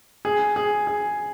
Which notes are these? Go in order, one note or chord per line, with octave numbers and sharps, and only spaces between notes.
G#4
G#4
G#4